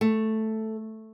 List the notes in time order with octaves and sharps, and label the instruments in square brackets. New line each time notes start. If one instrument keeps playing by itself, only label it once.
[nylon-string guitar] A3